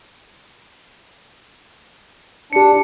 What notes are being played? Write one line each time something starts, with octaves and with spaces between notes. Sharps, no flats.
D4 G4 C#7